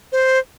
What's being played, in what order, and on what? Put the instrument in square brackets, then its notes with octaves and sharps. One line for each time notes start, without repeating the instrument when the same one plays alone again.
[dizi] C5